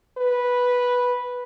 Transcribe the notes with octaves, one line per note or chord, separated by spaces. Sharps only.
B4